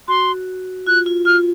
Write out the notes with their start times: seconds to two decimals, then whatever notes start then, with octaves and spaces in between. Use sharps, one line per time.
0.08 F#4 C6
0.87 F4 F#6
1.06 F4
1.25 F4 F6